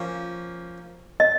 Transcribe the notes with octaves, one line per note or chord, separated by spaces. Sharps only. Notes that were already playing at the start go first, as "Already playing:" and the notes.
Already playing: F3 A#3 C#4
D#5